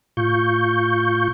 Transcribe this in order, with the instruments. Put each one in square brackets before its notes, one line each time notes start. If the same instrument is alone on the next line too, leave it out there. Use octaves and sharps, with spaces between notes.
[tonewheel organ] A2 F4 C#6 G6